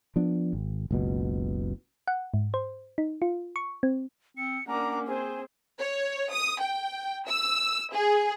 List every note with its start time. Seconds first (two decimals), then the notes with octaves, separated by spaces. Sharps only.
0.16 F3 B3 D4
0.53 G#1
0.91 F#1 C#2 B2
2.08 F#5
2.34 G#2
2.54 C5
2.98 D#4
3.22 F4
3.56 C#6
3.83 C4
4.37 C4 C#7
4.68 A#3 C#4 D4 F#5 A#5 D6
5.07 C4 G#4 C5 G#5
5.80 C#5
6.31 D#6
6.61 G5
7.28 E6
7.93 G#4